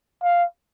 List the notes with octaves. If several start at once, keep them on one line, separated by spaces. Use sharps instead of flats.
F5